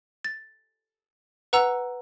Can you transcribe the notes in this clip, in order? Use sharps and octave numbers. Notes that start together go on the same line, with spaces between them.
A6
B4 F#5 A#5 E6